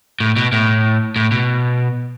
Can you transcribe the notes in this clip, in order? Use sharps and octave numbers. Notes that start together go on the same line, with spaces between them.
A2
B2
A2
A2
B2